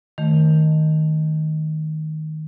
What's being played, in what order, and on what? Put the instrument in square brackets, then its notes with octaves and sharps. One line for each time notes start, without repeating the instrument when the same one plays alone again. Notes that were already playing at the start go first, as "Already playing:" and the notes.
[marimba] D#3 A3